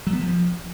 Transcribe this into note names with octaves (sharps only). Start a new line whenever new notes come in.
F#3
B3
F3